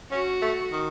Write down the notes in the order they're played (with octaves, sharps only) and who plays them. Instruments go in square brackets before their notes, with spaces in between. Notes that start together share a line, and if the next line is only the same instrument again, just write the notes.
[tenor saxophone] C#4 [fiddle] F#4
[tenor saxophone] A3
D#3